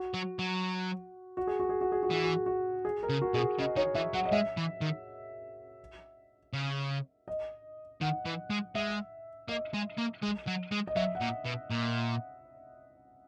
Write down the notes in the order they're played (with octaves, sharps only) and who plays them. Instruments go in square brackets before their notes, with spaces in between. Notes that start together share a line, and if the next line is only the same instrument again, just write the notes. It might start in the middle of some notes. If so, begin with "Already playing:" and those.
Already playing: [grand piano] F#4
[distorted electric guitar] F#3
F#3
[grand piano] F#4
G#4
F#4
G#4
F#4
G#4
F#4
[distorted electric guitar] E3 [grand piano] G#4
[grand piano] F#4
G#4
F#4
G#4
A#4
[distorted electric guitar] C#3
[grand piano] F#4
[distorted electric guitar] B2 [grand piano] G#4
[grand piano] F#4
[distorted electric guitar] C#3 [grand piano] D#5
[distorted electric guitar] D#3 [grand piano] C#5
[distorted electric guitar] E3 [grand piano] E5
[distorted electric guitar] F#3 [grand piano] F#5
[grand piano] D#5
[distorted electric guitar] G#3 [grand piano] E5
[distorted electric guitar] E3
D#3
C#3
[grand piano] D#5
[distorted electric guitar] D#3 [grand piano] F#5
[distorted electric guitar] E3
G#3
[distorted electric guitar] G#3 [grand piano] E5
[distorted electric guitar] A#3 [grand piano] D#5
[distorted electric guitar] G#3
A#3
G#3
F#3
G#3
[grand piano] D#5
[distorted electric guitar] F#3 [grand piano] E5
[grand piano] F#5
[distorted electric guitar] A#2
B2
A#2